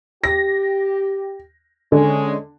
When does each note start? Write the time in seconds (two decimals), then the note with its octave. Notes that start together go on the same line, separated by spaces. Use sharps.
0.24 G4 A#6
1.92 D3 G#3 C#4